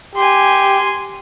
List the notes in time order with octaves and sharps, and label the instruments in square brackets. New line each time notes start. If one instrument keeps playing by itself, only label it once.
[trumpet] G4 [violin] G#5 C6